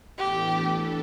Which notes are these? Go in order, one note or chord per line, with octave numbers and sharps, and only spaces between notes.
A2 E3 B3 D4 G4 A4